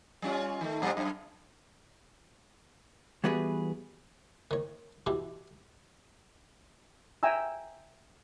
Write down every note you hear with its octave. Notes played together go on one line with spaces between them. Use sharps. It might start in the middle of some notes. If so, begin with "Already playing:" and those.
G3 C#4 F4
D#3 A3
A#2 G3 C4
F#2
E3 G3 B3 F#4 G#4 B4
D#3 C#5
B2 E3 E4 G4
E5 G5 G#5 A#5 E6